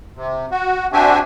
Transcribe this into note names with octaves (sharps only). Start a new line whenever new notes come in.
C3
F#4
C4 D4 F#4 G4 E5 G#5